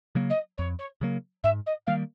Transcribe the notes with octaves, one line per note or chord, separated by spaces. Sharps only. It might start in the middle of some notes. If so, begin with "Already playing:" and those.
C#3 F#3 A#3
D#5
F2 C#5
C#5
C#3 F#3 A#3
G#2 E5
D#5
D#3 G3 A#3 F5